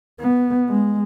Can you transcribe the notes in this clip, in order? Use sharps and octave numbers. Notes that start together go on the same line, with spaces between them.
B3
G#3